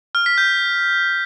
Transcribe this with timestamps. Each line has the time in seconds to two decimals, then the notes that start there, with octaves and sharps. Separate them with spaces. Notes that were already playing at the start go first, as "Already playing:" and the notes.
0.15 F6
0.26 B6
0.38 G6